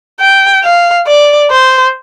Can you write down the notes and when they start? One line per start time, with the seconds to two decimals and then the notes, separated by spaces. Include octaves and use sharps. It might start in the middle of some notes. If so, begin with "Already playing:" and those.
0.20 G5
0.63 F5
1.07 D5
1.50 C5